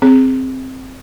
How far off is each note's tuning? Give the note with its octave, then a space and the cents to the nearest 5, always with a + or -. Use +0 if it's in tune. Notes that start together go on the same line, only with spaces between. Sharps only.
C4 +0 G#4 +0